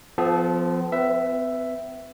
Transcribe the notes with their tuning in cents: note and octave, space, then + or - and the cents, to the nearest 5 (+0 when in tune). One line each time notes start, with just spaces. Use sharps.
F3 +0 B3 +45 A4 -25
C4 -45 B4 +0 E5 +5